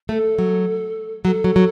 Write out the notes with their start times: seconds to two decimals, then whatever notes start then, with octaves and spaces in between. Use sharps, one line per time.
0.09 A3 A4
0.39 F#3
1.25 F#3 A4
1.44 F#3
1.56 F#3